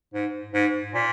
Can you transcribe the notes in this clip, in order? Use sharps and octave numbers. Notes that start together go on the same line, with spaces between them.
G#2
G#2
A#2